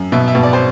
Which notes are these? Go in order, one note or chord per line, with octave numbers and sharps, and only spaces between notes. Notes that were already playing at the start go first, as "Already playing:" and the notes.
Already playing: F#2
B2 E5
E5
B2
D5
C5